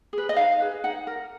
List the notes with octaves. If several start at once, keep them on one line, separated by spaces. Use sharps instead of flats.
G#4 B4
D#5
D#4 F5
G#4 B4
D#4 F#5
A#4